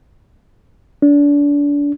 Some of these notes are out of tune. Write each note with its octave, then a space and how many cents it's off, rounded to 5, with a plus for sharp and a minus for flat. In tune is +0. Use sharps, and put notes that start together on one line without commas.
D4 -30